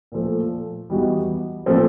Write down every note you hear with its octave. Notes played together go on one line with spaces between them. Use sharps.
A#2 F3 A3
E3 G3 B3 D#4 F#4
A#2 F3 A3 C4